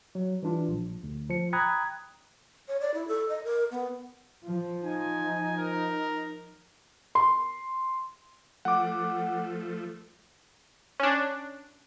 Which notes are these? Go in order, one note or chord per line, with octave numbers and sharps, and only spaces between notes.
F#3
E3 G3 D4 F4
A#1
D2
F3 C#7
G5 A#5 B5 D#6 F#6 G#6
C#5
D5
E4
A4
D#5
A#4
B3
F3
D#4 G#5
A#4
C6
F3 A3 F#5 D6
C#4 D4